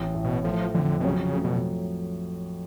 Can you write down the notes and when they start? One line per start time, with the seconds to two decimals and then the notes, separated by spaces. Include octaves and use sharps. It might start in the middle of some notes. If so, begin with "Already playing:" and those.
Already playing: A1
0.15 A2
0.24 B2
0.44 F3 A3
0.75 F2 D3
1.00 B2
1.04 C#3 F#3
1.24 C#3
1.34 A3
1.44 B2